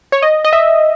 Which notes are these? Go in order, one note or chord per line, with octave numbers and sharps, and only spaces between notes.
C#5
D#5
D#5
E5